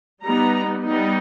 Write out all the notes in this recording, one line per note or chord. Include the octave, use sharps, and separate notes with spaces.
G3 B3 D#4 A#5
G3 B3 D#4